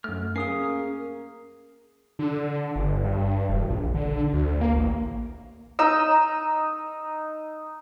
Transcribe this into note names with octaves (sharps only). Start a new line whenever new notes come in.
F#2 A3 F6
A#3 C#4 G#4 D#6 C7
D3
G1
G2
E1
A#1
D3
D2
A#3
A1
D#4 D#5 A#5 E6